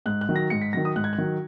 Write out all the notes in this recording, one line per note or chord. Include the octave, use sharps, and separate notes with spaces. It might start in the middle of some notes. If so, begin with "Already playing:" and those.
G#2 F#6
F#6
D#3 F#3
A#6
G#2 C#7
B6
D#3 F#3 A#6
D#6
G#2 F#6
G#6
F#6
D#3 F#3